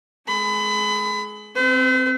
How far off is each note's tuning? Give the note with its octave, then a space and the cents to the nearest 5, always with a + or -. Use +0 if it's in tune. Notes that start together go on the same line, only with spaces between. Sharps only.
G#3 +25 B5 +30
C4 +0 C5 -45